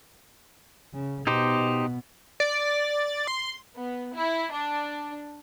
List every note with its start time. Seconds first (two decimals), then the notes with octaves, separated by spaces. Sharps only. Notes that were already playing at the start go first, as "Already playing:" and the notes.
0.93 C#3
1.27 B2 B3 D#4 G4 C5
2.40 D5
3.27 C6
3.76 B3
4.13 E4
4.51 D4